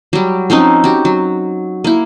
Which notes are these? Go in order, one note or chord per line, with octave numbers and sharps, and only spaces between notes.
F#3 G3
F3 C4 C#4 D#4
F#4 G4
F#3
A#3 E4